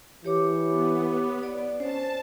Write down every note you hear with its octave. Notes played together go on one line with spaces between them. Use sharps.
E3 G4 C#5 D6
B3
D5
C#4 C5 A5